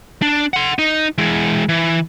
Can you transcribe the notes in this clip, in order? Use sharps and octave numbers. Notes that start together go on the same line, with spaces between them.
D4
F#5 C6
D#4
E3 G#3
E3